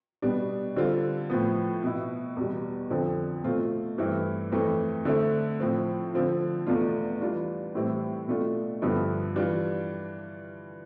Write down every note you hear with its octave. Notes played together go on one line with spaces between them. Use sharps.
B2 G3 B3 D4
D3 G3 C4 F4
A2 F3 B3
B2 B3 E4
E2 B2 G3
F2 D3 F3 C4
B2 A3 C4 F4
G2 E3 A3 C4 E4
F2 E3 A3 C4
D3 A3 C4 E4
A2 F3 C4
D3 F3 C4 F4
E2 B2 A3 D4 F4
E3 G3 D4 F4
A2 E3 G3 C4 E4
B2 A3 D4 F4
G2 D3 F3 B3 E4
E3 G3 D4 F4